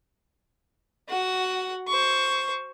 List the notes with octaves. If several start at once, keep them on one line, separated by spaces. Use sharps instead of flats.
F#4 F#5
C5 C#6